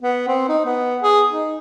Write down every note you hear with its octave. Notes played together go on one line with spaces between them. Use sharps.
B3
C4
D#4
B3
G#4
D#4